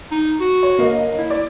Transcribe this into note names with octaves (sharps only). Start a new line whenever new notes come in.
D#4
F#4
C#5
G1 A#3 D#5
E4
D5